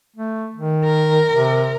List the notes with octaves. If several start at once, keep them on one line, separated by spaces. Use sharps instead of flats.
A3
D#3
A#4
C3